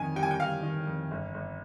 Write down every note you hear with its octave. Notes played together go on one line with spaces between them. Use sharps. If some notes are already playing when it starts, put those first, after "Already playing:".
Already playing: F2 D#3 G#5
G3 G5
G#5
G5
G3 F5
D#3
F2
G1
G1